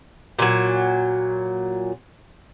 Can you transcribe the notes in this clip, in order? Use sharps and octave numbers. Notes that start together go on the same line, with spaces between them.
A#2 F#3